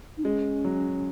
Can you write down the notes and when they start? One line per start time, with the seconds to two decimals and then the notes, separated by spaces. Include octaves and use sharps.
0.18 D#4
0.24 G#3 C#4
0.65 F#3